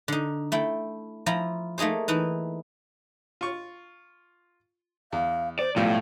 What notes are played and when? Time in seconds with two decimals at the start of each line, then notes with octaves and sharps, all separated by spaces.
0.08 D3 D#4
0.52 A3 E4 G5
1.26 F3 E4 F4 A#5
1.78 A3 A#3 D#4 G#4 C5
2.08 E3 D#4 E4
3.41 F4 C#6
5.13 E2 F5
5.59 C5 D5
5.76 B1 A2 F3 G3 F5